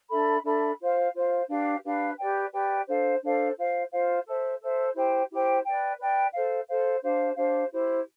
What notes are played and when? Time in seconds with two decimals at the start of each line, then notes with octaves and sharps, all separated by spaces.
0.10 D4 A4 E5 B5
0.44 D4 A4 E5 B5
0.79 F4 C5 F5
1.13 F4 C5 F5
1.48 D4 G4 B4 F5
1.83 D4 G4 B4 F5
2.17 G4 B4 D5 G5
2.51 G4 B4 D5 G5
2.87 D4 A4 C5 F5
3.22 D4 A4 C5 F5
3.56 F4 C5 F5
3.91 F4 C5 F5
4.25 A4 C5 E5
4.59 A4 C5 E5
4.94 E4 G4 C5 G5
5.29 E4 G4 C5 G5
5.64 B4 D5 G5
5.99 B4 D5 G5
6.32 A4 C5 F5
6.68 A4 C5 F5
7.02 D4 G4 C5 F5
7.37 D4 G4 C5 F5
7.71 E4 G4 C5